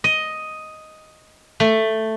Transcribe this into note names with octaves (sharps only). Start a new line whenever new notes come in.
D#5
A3